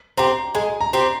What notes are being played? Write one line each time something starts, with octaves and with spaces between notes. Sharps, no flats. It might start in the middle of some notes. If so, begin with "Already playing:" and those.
C4 G4 A#5
G#3 G#5
A#5
C4 G4